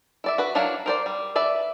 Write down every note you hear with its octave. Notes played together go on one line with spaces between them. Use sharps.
E4 D5 E5
F#4 B4
F#3 D4 E4 A#4 F5
A#4 C5 D5
G3
B4 D5 E5